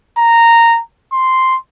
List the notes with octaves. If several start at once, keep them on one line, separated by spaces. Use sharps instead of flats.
A#5
C6